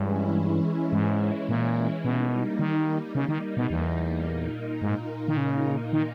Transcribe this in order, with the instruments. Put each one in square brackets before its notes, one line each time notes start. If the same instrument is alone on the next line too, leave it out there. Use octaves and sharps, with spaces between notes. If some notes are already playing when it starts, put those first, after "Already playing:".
Already playing: [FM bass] G2 [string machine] E3 G#3 C#4 E4
[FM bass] G#2
A#2
[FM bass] B2 [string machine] G3 A#3 D#4
[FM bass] D#3
C#3
D#3
B2
E2
[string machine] A#2 A#3 D#4
[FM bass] G#2
D#3
C#3
D#3